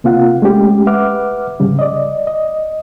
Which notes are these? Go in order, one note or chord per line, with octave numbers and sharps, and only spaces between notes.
C3 A#3 C4 F4 F5 F#5
G#3 A3 C#4 G4
B4 E5 F#5 D6 F6
G#2 C#3 G3
D5 D#5
D#5